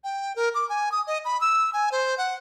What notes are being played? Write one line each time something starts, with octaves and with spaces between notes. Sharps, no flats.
G5
A#4
D6
G#5
D#6
D#5
B5
E6
G#5
C5
F#5